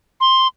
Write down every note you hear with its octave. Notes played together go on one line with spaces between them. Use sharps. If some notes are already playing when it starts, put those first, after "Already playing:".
C6